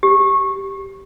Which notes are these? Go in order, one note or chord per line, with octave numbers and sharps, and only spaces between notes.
G4